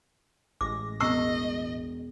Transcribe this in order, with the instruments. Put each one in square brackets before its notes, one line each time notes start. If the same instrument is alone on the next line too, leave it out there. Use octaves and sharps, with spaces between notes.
[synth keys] A1 G#3 A#6 [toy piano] D6
[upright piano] E1 C7 [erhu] D#5 [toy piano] A#5 C#6 E6